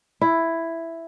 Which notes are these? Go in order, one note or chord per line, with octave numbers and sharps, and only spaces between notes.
E4